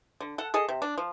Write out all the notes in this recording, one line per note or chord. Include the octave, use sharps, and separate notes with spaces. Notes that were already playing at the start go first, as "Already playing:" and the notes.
D3
A4 F#5
G#4 A4 D#5
C3
D4
F3